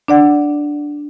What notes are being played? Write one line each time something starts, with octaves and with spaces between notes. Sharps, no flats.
D4 D5 F#5